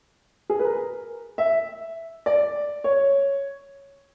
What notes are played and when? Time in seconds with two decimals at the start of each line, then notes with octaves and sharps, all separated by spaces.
0.50 G#4
0.59 B4
0.65 A#4
1.38 E5
2.26 D5
2.84 C#5